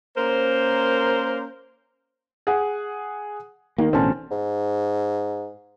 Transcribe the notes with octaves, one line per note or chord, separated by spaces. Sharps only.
A#3 C#4 A#4 C5
G#4 F#5
D#3 A#3
A1 B2 D3 C4 C#4 A5
G#2